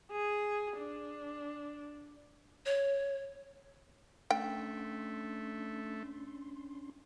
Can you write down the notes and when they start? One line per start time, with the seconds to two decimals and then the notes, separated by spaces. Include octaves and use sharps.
0.11 G#4
0.78 D4
2.66 C#5
4.31 A3 C#4 D4 G5 C6